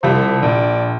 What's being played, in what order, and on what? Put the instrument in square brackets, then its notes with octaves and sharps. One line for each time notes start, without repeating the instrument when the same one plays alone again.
[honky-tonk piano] C2 F3 G3 [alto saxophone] C5
[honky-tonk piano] A#1 [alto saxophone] D5